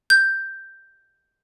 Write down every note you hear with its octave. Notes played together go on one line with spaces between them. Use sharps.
G6